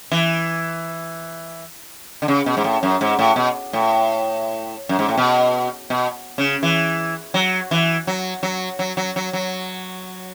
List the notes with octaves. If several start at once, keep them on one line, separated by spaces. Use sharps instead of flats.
E3
D3
C#3
B2
G#2
A2
F#2
G#2
A2
B2
A2
F#2
G#2
A2
B2
B2
C#3
E3
F#3
E3
F#3
F#3
F#3
F#3
F#3
F#3